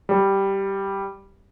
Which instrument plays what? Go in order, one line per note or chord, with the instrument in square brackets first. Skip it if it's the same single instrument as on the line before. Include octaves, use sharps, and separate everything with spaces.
[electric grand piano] G3